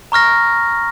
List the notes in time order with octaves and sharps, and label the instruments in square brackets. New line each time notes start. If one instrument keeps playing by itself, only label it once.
[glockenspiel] A#5 C#6 F6 A#6